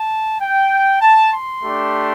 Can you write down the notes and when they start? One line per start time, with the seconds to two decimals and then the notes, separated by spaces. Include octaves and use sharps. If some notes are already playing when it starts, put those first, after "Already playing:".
Already playing: A5
0.41 G5
1.01 A5
1.32 C6
1.62 A3 D4 G4